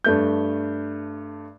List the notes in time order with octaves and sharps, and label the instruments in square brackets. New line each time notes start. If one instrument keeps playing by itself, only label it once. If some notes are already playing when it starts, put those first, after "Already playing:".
[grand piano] G2 A3 G6